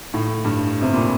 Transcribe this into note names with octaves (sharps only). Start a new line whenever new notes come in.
A2
G2
C3
A#2